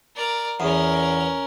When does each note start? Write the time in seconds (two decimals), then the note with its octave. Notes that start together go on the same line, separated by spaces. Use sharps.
0.16 A#4 D5
0.60 E2 C#4 A#4